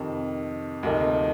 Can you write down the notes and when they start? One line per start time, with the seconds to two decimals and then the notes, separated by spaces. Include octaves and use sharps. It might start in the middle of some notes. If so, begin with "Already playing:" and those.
Already playing: F2 C3 D#3
0.83 D2 C3 F3 A#3 D#4